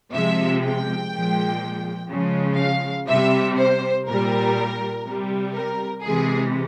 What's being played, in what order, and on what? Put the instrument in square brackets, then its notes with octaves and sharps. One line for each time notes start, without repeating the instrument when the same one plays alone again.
[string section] C3 F3 G#3 E5
G5
A#2 F3 G#3
C#3 F3 G#3
F5
C3 G3 E5
C5
A#2 G3 A#4
C3 G3
A#4
C3 E3 G#3 G#4